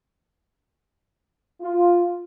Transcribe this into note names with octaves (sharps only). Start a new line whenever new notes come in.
F4